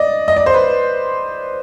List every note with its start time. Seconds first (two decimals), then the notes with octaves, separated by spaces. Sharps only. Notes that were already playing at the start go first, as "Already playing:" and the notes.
Already playing: D5 D#5
0.28 D#5
0.36 D5
0.46 C5
0.54 B4